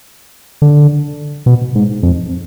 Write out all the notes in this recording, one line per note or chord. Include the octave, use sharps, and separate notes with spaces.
D3
B2
G#2
F2